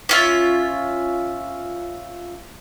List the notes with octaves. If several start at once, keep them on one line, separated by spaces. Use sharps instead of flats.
C#4 F4 E5